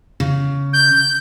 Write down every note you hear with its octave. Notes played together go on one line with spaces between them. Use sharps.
C#3
G6